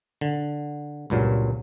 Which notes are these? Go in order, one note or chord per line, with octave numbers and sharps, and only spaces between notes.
D3
C#2 G2 A#2 F#3